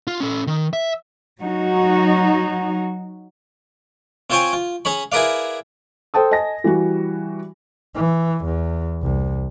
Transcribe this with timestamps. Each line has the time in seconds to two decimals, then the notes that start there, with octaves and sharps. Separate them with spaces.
0.07 F4
0.20 C#4 A4
0.47 D#3
0.73 E5
1.42 F#3 D#4 F#4
4.30 C4 F4 C5 C#5 G5 G#5
4.53 F4
4.85 C#4 G#4 C#5 B5
5.12 E4 G#4 A#4 B4 D5 F5
6.14 A4 C5 G5 A5 D#6
6.31 D#5 G#5 A5 A#6
6.64 E3 G3 F#4
7.95 E3
8.45 E2
9.03 C2